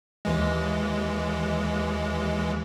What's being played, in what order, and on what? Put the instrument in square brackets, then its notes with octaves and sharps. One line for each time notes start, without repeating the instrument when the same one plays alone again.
[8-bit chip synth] D#2 E3 G#3